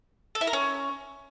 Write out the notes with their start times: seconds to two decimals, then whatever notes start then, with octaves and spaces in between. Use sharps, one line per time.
0.35 A4
0.41 E4
0.47 A#4
0.53 C#4